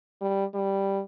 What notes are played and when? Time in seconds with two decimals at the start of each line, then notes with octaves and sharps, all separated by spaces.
0.21 G3
0.54 G3